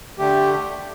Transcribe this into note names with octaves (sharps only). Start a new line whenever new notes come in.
D3 A3 G4